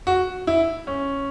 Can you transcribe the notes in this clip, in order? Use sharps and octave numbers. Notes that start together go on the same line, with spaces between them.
F#4
E4
C#4